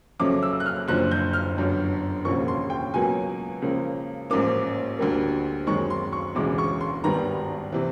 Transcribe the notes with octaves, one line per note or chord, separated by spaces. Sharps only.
F2 C#3 F#3 A3 C#4 D6
E6
F#6
F6
F#1 F#2 D3 F3 F#6
G6
F6
G1 F#2 D3
E1 D#2 C#3 F3 A#3 C#6
C6
G5
C#2 B2 F#3 A#3 C#4 G#5
C#2 C#3 F3 A#3
A1 G#2 F3 A#3 C#4 D6
D2 D3 G3 A#3
F#2 D#3 G#3 C4 C#6
C6
C#6
E1 D2 C#3 E3 G#3 D6
C#6
C6
G#1 G2 D#3 G3 B3 A#5
C3 E3